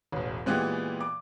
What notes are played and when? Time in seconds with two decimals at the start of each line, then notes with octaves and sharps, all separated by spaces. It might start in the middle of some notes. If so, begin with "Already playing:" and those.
0.12 E1 A1
0.46 A#2 E3 G#3 B3 G4
1.01 D6